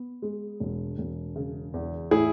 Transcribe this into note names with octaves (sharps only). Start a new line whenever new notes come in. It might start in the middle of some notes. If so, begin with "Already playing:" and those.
Already playing: B3
G#3
E1
E1
C#3
E2
A2 E4 G#4